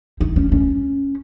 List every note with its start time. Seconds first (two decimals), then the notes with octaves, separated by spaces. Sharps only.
0.21 D#4
0.36 C#4
0.52 C#4